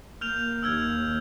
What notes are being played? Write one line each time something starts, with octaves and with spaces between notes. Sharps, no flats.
A#3 F6 G6 F7
D#2 E6 F6 G#6